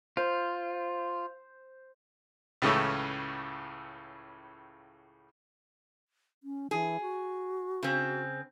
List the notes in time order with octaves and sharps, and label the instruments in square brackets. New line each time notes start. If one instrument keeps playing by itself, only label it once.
[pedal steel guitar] F4 [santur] C5
[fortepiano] C#2 A2 C#3 E3 A3 C#4
[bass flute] C#4
[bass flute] E3 [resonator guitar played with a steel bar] G#4
[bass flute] F#4
[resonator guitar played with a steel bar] C#3 C4